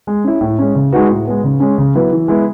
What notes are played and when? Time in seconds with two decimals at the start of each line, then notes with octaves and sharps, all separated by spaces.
0.07 G#3
0.24 C#4 E4
0.41 A2
0.58 G#3 C#4
0.75 C#3
0.92 G#3 D#4 F#4 B4
1.10 A2
1.26 G#3 B3
1.44 C#3
1.60 G#3 C#4
1.78 C#3
1.95 F#3 B3 E4 B4
2.12 E3
2.28 G#3 B3 E4